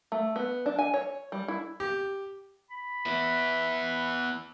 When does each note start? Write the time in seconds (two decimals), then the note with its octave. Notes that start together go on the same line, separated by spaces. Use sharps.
0.12 A3
0.36 B3
0.66 D4
0.79 G#5
0.94 C#5
1.32 G3
1.48 E4
1.80 G4
2.70 B5
3.06 B3 E4